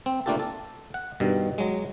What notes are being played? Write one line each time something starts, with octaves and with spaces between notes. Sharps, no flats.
C4
A3 A#3 D4 F4 G4 A4
A4
F#5
G2 B2 D#3
F#3 G#3